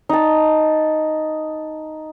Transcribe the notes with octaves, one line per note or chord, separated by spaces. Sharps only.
D#4 A5